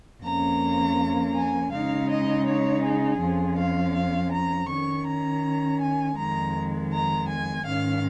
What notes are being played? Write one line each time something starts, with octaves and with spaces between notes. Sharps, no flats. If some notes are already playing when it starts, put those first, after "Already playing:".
F2 F3 A#3 C#4 A#5
G#5
C#3 G#3 D#4 F5
D#5
C#5
G#4
F2 F3 C#4
F5
F5
A#5
D#3 C#4 C#6
A#5
G#5
F2 D#3 G#3 A#5
A#5
G#5
G#2 D#3 C#4 F5